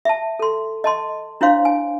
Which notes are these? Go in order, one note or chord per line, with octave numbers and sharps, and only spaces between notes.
E5 A5
A4 C6
D#5 A5 C6
D4 E4 C5 C#5 F5 C6
G#5